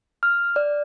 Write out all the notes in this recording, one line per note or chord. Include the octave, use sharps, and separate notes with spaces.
F6
D5